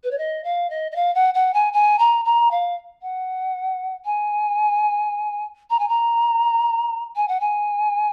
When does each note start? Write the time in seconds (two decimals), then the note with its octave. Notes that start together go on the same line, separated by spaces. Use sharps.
0.03 B4
0.10 C#5
0.18 D#5
0.44 F5
0.70 D#5
0.91 D#5
0.95 F5
1.14 F#5
1.34 F#5
1.53 G#5
1.73 G#5
1.99 A#5
2.25 A#5
2.51 F5
3.02 F#5
4.05 G#5
5.70 A#5
5.79 G#5
5.88 A#5
7.15 G#5
7.28 F#5
7.40 G#5